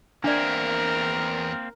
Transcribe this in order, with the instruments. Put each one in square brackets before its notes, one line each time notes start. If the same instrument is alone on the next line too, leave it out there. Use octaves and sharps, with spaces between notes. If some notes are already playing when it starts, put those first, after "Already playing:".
[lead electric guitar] E2 E5 [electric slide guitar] A#3 C4 [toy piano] D4 D5 [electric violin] A#4